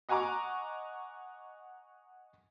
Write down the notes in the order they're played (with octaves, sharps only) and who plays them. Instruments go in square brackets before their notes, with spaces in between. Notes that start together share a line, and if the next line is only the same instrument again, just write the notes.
[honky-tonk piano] D#5 F#5 G#5 A#5 C#6 D6